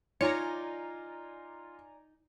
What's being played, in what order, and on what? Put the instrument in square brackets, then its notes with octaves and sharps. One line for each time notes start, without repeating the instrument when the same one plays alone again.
[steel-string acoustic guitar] D#4 [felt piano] F4 [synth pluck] C#5 [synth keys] D5 G#5 A#5